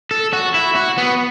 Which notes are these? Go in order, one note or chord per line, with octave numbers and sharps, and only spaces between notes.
A4
F#4
E4
F#4
B3